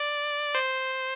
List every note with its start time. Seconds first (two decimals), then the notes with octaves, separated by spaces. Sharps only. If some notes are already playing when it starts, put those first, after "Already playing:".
Already playing: D5
0.55 C5